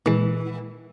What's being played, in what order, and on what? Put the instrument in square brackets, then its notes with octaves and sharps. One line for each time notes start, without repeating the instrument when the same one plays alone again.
[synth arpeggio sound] A#2 G#3 [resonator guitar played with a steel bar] E3